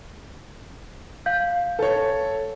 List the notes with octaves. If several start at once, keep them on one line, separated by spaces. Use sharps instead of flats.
F5 G6
A4 C#5